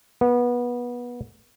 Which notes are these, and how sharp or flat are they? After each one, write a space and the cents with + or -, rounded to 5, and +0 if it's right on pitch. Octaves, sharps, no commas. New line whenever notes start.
B3 -20